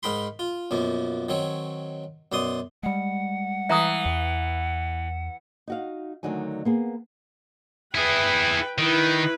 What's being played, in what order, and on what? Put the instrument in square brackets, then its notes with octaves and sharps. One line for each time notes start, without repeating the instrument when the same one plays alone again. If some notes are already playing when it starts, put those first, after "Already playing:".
[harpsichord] G#2 D#4 A#4 G5 B5 C6
F4
F#2 B2 F3 A#3
D#3 F#3 C4 C#5
F#2 B2 D5 C6 D#6
[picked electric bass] G3 G#3 [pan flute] F#5
[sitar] E3 [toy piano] E5 A#5 D#6
[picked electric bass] E2
[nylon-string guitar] D#4 F#4 F5
D2 D3 D#3 F#3 D#4 G#5
A#3 B3 G#4
[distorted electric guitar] E4 G#4 [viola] B4 G5
[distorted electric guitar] D#3 [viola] E4 B4